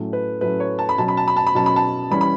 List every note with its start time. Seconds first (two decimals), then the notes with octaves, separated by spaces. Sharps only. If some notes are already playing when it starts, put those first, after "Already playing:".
Already playing: A2 F#3 A3 C#4
0.13 B4
0.41 A2 F#3 A3 C#4 B4
0.60 C#5
0.79 A5
0.89 B5
0.98 B2 F#3 C#4 A5
1.08 B5
1.17 A5
1.28 B5
1.37 A5
1.47 B5
1.55 B2 F#3 C#4 A5
1.66 B5
1.76 A5
2.11 E3 G3 C#4 B5
2.21 B5